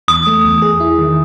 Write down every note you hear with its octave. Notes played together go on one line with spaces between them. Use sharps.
E2 D#6
A3
E2
G#4
E4
D#3